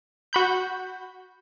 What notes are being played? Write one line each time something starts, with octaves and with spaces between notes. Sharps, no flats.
F#4 B5 G6